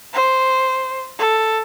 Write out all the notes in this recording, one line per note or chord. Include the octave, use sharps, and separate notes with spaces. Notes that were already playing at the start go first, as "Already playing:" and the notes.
C5
A4